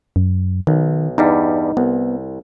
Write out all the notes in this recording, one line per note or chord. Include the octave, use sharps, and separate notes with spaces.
F#2
B1 D#3
E2 G2 G3 D#4
C2 B3